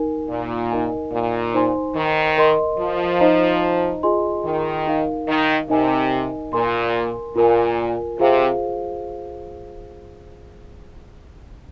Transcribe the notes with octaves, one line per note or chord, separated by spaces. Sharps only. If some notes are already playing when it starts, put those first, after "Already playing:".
Already playing: D#4 A#4 G#5
A#2
D#4 A#4 D#5 G#5
A#2
D#4 C5 G#5 C6
D#3
A#4 D#5 C6
F3
D#4 C5 D#5 A#5
F4 G#4 D#5 G#5 C6
D#3
D#4 A#4 F5
D#3
C3 D#4 A#4 D#5 G#5
A#2 A#4 G#5 C6
A#2 F4 A#4 G#5
C3 F4 G#4 C5 F5